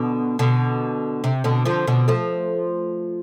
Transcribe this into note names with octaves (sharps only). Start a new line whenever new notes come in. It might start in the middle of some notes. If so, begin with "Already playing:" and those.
Already playing: B2 D3
B2 D3
C3
B2 D3
D3 F3
B2 D3
F3 A3